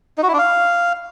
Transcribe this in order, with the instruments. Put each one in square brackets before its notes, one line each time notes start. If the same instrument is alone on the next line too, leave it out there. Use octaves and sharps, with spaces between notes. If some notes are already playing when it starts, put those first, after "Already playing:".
[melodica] D#4
F#4
E4
D4
F5